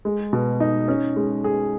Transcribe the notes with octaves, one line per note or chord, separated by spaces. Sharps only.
G#3
B2
D#4
C#4
G#3
G#4